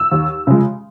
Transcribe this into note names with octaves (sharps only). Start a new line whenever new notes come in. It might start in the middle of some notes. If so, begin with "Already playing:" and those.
Already playing: E6
D#2
C#3 F3 G#3